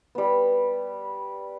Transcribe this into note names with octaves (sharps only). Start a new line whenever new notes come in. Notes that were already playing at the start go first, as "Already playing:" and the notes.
G3 B3